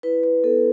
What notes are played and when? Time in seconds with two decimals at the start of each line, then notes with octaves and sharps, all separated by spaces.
0.03 E4 B4
0.23 B4
0.44 B3 A4